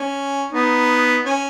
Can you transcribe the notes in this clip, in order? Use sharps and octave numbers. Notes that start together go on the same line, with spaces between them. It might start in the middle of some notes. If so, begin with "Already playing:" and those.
Already playing: C#4
B3 D#4
C#4